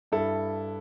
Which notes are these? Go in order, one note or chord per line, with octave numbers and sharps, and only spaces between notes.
G2 E4 A4